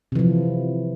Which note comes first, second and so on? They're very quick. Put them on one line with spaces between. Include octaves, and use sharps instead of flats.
C3 E3 F3